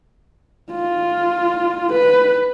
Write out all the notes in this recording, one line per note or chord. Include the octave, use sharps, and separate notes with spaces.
F4
B4